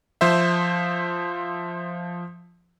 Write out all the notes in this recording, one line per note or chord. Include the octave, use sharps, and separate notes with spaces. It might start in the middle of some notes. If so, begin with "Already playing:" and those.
F3 C5 E5